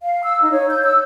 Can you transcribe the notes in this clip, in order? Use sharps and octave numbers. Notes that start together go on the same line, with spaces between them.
F5
E6
D#4
C#5
G6
E6